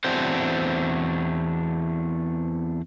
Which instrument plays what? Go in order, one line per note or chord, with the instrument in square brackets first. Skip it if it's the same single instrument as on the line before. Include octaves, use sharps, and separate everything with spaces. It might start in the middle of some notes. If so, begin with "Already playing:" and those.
[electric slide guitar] E2 A3 C4 D4 F#4 C5